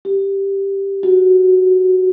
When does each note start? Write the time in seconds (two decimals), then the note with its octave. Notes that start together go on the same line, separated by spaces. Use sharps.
0.05 G4
1.03 F#4